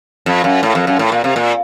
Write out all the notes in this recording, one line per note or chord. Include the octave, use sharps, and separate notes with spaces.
F2
F#2
A2
F2
F#2
A2
A#2
C3
A#2